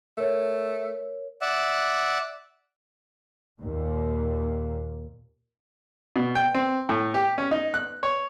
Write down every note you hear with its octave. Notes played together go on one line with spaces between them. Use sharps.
A3 A#4 C#5
D5 E5 F#5
D#2 A#2
B2
G5
C4
A2
G4
C#4
D#4
F#6
C#5